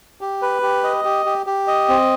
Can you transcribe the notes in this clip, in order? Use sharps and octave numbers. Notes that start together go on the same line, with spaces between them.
G4
B4
G4
D#5
G4
G4
G4
D#5
C4